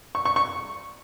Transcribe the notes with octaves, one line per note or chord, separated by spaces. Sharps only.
C#6
C#6
C#6